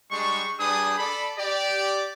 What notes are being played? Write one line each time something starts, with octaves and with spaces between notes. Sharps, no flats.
G3 G#3 D4 C#6
G3 D4 G#4 B4 D#6
A4 D5 B5
G4 D5